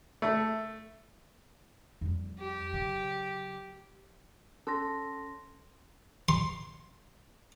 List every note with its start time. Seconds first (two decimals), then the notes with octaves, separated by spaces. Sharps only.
0.22 A3
2.01 F2 G3
2.40 G4
2.73 C#3 F#3
4.67 C#4 A4 C6 A#6
6.29 C6